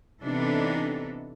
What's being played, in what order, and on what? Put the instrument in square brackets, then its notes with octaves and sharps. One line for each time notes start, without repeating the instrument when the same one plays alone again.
[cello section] C3 E3 B3 D4 D#4 A4